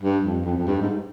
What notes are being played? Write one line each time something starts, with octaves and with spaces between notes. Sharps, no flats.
G2
F2
F2
F2
G2
G#2